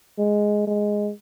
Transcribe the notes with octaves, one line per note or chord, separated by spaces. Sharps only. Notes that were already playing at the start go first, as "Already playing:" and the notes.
G#3
G#3